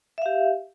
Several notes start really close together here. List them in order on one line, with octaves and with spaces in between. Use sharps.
E5 F5 G4